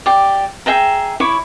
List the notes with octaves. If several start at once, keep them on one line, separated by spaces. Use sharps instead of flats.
G4 D5
G#4 E5 G5 A#5
E4 C#5 B5 D6